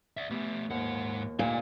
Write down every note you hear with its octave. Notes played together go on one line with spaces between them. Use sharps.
D5 E5
A3 B3 G4 E5
D#2 G#2 F3 F#5
D2 A#2 G3 D#4 D5 G#5